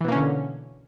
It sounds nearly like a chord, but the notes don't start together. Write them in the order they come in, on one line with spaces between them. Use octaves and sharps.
E3 B2 A#3 C#4 D3